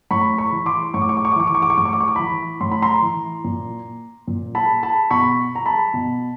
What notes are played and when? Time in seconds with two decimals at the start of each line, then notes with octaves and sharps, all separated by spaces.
0.11 A2 B5 C#6
0.38 B5 C#6
0.52 E3
0.66 C6 D6
0.94 A2 C#6
1.02 D6
1.09 C#6
1.17 D6
1.25 C#6
1.32 D6
1.36 E3 C#6
1.47 D6
1.55 C#6
1.62 D6
1.70 C#6
1.77 A2 D6
1.85 C#6
1.93 D6
2.00 C#6
2.08 D6
2.15 E3 B5 C#6
2.61 A2 C6
2.72 B5
2.82 A#5 C6
3.02 E3
3.44 A#2
4.28 A#2
4.55 A5 B5
4.83 A5 B5
5.11 B2 B5 C#6
5.55 A#5
5.66 A5 B5
5.94 B2